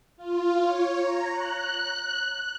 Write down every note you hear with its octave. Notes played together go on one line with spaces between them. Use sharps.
F4
C#5
A#5
F#6